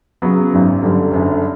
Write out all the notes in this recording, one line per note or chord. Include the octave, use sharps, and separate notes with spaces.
C#3 F#3 B3
G#1 F#2 D#3
G1 F#2 D3 G3
F#1 F#2 D3